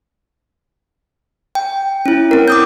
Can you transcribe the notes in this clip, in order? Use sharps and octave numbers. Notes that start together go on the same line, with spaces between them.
G5
C#4 E4
C4 A#4
D6 D#6 G6